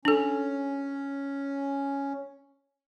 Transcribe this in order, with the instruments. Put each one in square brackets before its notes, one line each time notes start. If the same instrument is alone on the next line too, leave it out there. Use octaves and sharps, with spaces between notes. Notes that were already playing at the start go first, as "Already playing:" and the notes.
[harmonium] C#4 [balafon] D4 A4